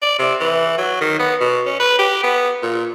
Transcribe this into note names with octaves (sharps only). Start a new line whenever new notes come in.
D5
C3
E3
F#3
D#3
B3
B2
C#4
B4
G4
B3
A#2